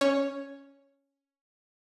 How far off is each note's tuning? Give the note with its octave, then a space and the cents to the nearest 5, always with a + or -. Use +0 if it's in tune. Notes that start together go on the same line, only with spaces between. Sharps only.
C#4 +0 C#5 +0